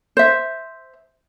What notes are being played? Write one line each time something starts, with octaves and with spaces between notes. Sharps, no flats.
C5 E5